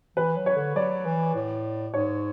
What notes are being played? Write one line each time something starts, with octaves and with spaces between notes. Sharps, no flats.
E3 B4
F#3
C#5
D3
F#3 D5
E3
A2
G#2 C#5